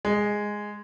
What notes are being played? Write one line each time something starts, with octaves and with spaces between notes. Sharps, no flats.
G#3